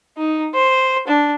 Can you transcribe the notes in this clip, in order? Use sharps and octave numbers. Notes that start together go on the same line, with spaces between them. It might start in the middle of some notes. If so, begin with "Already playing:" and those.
D#4
C5
D4